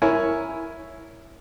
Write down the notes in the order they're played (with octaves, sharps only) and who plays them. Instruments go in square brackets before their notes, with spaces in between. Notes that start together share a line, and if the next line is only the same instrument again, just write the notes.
[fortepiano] E4 A#4 C#5 G#5